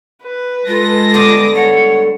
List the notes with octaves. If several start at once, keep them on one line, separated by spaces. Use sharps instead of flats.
B4
G#3 F4 A4 A#6
G2 D3 B3 D6 D#6
C#5 F#5